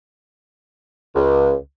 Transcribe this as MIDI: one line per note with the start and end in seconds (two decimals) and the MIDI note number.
1.16 1.53 37